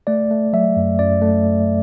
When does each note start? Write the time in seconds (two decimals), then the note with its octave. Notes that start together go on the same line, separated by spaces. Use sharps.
0.07 A3 D5
0.31 A3
0.53 F#3 E5
0.76 F#2
0.99 F#2 D5
1.22 A3